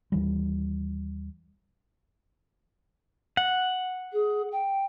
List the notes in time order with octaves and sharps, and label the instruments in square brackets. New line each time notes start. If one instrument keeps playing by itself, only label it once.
[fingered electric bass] D#2 E3 G3
[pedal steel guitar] F#5
[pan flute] G#4
G5